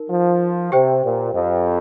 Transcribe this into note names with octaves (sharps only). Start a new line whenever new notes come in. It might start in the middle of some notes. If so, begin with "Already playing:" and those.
Already playing: D#4 A#4
F3
C3 G4 C5 G5
A#2
F2